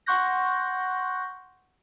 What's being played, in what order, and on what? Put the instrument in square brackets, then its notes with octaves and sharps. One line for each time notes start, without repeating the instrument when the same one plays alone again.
[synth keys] F#5 C6 C#6 F#6 G6 A#6